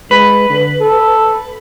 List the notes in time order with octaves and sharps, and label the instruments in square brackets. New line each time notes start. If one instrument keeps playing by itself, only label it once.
[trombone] G#3 [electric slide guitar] B4
[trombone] D3
A4